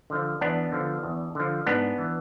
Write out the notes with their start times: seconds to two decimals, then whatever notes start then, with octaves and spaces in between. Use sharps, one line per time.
0.10 D3 F3
0.41 E2 B3 D4
0.72 D3 F3
1.03 E2
1.35 D3 F3
1.67 G#2 B3 D4
1.98 E3